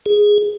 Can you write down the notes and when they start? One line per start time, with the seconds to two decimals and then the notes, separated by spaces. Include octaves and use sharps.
0.06 G#4